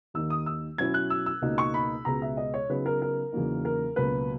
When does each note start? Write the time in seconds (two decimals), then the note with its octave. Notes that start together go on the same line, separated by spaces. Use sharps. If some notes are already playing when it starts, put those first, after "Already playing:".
0.14 D#2 D#3 A#3 D#4 E6
0.30 D#6
0.46 E6
0.78 B2 F#3 C#4 E4 G#6
0.94 F#6
1.10 E6
1.26 E6
1.42 C#2 B2 A#3 D#4
1.58 C#6
1.74 B5
2.05 C#2 B2 G#3 B3 A#5
2.22 E5
2.37 D#5
2.54 C#5
2.70 C#3 F#3 B3 D#4 B4
2.86 A#4
3.02 A#4
3.32 E2 C#3 F#3 A#3 D#4
3.65 A#4
3.96 C#2 B2 F#3 A#3 B4